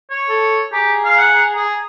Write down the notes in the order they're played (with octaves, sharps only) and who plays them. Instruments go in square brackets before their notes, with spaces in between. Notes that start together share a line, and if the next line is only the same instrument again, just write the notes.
[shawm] C#5
[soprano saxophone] A4
[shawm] G4 [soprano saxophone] G#4 [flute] A#5
[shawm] F5
F#5
[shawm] G#4 [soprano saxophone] G#5